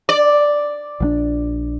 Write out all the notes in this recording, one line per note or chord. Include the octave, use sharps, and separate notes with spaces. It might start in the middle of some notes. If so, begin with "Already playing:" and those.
D5
A#1 F3 D4